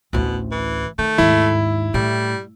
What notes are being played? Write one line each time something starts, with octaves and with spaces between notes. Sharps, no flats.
A1 D2 B2
E3
D#3 A3
D#2 G#2 E4
A2 G3